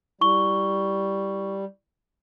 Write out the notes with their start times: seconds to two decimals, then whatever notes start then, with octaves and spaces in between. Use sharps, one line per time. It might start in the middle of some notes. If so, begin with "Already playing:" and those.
0.21 G3 E4 C#6 G7